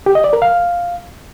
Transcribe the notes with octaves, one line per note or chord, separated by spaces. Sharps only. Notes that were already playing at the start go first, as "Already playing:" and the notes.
G4
D#5
D5
A#4
F5